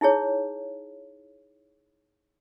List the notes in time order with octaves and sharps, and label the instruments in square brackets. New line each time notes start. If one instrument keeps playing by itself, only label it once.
[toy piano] D#4 E4 G#4 C#5